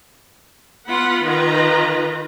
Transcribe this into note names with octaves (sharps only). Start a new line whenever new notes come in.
B3 F4 F#5 B5
D#3 F4 B4 D#5 A#5